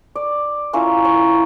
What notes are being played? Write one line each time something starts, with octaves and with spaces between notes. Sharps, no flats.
D5
C#4 E4 F4 A#4
C#5